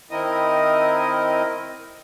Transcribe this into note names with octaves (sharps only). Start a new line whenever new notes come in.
D#3 C4 E4 A#4 D#5 D#6